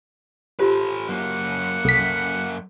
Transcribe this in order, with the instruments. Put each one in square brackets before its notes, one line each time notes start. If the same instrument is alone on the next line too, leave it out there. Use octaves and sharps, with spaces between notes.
[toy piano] F4 G4 C5 [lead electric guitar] A4 B4
[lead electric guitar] F#2 A#3 [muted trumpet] F#5
[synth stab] C2 B6 [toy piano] A4